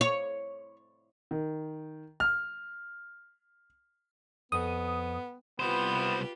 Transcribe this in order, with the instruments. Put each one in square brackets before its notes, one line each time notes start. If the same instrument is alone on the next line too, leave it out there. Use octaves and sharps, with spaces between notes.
[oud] C#5
[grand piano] D#3
F6
[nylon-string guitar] F2 [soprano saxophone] B3 [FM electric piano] D#6
[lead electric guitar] C2 C5 [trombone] B3 [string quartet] F4 G4 B4